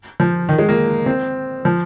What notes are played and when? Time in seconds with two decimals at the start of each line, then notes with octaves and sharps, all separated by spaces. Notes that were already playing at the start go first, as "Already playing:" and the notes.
0.20 F3
0.49 D#3
0.58 G#3
0.69 A#3
1.06 C4
1.65 F3